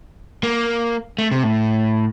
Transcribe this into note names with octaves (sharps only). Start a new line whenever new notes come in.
A#3
A3
C3
A2